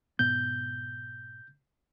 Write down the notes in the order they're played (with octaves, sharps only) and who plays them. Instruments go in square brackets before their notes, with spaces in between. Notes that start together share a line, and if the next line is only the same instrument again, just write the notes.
[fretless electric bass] G#2 B2 B3 [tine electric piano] G6